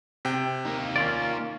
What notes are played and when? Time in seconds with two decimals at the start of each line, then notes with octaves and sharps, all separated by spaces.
0.25 C3 G5
0.65 A#3 D#4
0.96 C#4 F4 D5